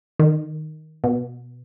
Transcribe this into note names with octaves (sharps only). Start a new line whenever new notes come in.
D#3
B2